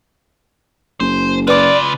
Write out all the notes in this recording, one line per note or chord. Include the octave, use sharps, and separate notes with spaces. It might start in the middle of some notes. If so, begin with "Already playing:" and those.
F#1 C5
C#3 F4 B4 D5 D6